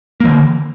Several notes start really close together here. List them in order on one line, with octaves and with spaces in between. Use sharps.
A#3 E3 D3